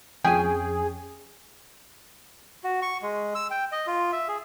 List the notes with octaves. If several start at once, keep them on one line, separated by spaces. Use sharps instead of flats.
F2 C#4 G#4 G5 G#5
F#4
C#6
G#3
E6
G5
D#5
F4
E5
G#4